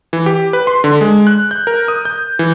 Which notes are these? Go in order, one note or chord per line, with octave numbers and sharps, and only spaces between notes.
E3
G4
B4
C6
D3
G#3
F#6
G6
A#4
D#6
G6
E3